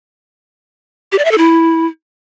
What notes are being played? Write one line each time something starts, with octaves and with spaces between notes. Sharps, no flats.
G4
D5
E5
A4
E4